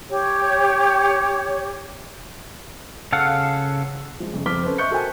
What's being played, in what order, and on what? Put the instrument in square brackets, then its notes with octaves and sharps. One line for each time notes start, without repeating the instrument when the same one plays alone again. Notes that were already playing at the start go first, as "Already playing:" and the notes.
[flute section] G4 C#5
[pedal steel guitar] C#3 A4 F5 F#5
[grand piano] F3 G#3
F2 C#3
F2 C4 D6 F6 B6 G7
C#4 A4 B4 C5
D#5 E5 C#6 F#6 G6 C#7
F#4 A4 A#4 C5 G5 G#5